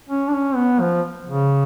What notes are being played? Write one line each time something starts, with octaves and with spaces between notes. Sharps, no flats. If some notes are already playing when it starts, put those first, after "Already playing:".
C#4
D4
C#4
B3
F3
C#3